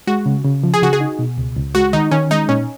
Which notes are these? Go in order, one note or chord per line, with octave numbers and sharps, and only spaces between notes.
G#3 F#4
C#3
C#3
F3
G#4
C#3 F#4
G#4
D#4
B2
C#2
C#2
G#3 F#4
D#3 D#4
D#3 C#4
G#3 D#4
A#2 C#4